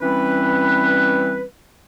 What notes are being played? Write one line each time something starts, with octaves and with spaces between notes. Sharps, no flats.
E3 G3 C4 C#4 B4